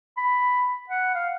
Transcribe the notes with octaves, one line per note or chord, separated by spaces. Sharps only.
B5
F#5
F5